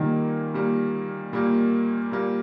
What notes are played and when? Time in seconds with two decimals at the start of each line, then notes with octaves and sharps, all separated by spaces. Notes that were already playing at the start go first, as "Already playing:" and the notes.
Already playing: A#2 D#3 G3 A#3
0.54 A#2 G3 A#3
1.33 A#2 G3 A#3
2.11 A#2 G3 A#3